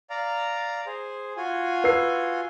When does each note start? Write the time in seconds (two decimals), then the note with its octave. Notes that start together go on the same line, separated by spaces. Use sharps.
0.10 D5 F5 A#5
0.86 G#4 C5
1.37 F4 F#4 G#5
1.84 B4 E6 C7